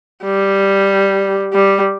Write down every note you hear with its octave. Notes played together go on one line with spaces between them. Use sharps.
G3
G3